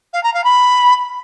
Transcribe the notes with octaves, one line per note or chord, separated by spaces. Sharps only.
F5
A#5
F5
B5